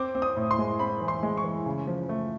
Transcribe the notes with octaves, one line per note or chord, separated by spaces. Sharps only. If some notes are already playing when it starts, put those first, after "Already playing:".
Already playing: C4 D6
C4
D#6
A2
C6
G#3
C4 B5
E3
C6
G#3
C#6
E3
C#3
F3
A3